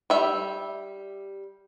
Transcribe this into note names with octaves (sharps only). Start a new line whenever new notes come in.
G3 E5